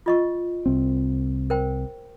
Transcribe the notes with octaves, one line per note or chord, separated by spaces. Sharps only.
F4 D#5 C#6
C2 C4
A#4 C5 G5